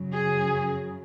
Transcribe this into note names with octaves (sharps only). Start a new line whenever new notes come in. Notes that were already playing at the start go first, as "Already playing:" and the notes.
Already playing: F#2 C#3 F#3
G#4